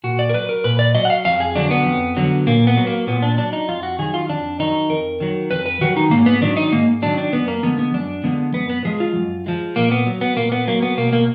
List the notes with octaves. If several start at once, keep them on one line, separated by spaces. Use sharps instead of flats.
A#2 F#4
D5
A#4
F#3 B4
A#4
A#2 B4
D5
F#3 D#5
F#5
F5
F2 F5
G#4
D3 F#3 D4
B3
F2
D3 F#3
A#2 A#3
B3
F#3
A#3
A#2 B3
D4
F#3 D4
D#4
F2 F4
F#4
D#3 F#3 G#4
F4
F2 D4
D#3 F#3 D#4
F2 A#4
D#3 F#3
F2 B4
B4
D#3 F#3 F#4
D#4
G#2 A#3
B3
D#3 F#3 D4
D#4
G#2 A#3
D#3 F#3 D4
D4
F#2 B3
A#3
D3 F3 G#3 B3
B3
F#2 D4
D3 F3 G#3 B3
F#2 B3
B3
F3 G#3 G#4
F4
F#2
F3 G#3
A#2 A#3
B3
F#3
B3
A#2 A#3
B3
F#3 A#3
B3
B2 A#3
A#3